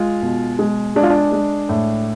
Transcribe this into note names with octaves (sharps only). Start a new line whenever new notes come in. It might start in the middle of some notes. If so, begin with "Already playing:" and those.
Already playing: G#3 F4
B2
G#3
G#3 D4
F4
D4
G#3
A2